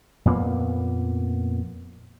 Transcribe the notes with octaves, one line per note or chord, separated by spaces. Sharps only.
F2 A#2 A#3 B3